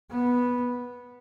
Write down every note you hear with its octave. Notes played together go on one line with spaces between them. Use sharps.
B3